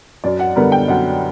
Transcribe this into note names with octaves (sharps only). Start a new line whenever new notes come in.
F#2 D5
F#5
D3 G3 B3 A#4
G5
F#2 F#5